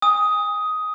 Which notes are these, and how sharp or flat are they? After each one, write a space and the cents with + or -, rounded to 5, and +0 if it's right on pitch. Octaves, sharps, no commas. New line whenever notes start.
G#5 -30 D#6 +10